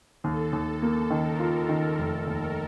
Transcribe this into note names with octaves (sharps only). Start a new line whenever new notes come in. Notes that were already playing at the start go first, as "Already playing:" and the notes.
D#2 A4
D#2
A#3
D#3 A#4
F4
D#3
F1 A4
D#2 A#4